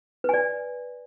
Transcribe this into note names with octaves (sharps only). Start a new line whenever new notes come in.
B4 D5 G#5